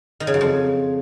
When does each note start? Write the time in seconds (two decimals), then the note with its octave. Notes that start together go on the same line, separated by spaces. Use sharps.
0.20 D#3
0.27 C#3
0.34 F#2
0.41 F2